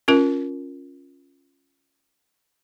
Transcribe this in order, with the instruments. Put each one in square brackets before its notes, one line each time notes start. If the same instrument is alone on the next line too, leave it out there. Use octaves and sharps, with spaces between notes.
[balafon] C#4 F4 A#4